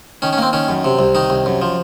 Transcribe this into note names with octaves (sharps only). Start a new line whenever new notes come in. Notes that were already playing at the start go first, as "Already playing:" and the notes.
D#3 C#4
C#4
A#3 C4
D#3 C#4
F#2
C3
C2
D#3 D#4
C2
F#2
F3